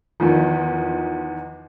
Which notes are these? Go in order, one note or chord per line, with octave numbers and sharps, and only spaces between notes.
E2 D#3 F3